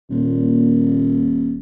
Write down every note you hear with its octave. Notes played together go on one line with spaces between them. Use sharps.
D#1 A#2